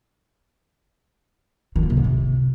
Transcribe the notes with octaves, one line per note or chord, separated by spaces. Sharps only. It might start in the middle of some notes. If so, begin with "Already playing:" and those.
D#3
A#3
C3
D3
C3